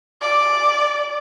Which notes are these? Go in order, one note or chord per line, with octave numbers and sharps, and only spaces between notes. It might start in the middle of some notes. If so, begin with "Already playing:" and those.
D5